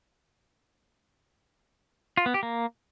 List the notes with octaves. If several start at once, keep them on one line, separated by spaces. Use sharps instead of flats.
F4
B3
G4
A#3